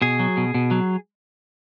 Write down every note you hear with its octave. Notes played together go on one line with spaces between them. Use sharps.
B2 G#4
F#3
B2
B2
F#3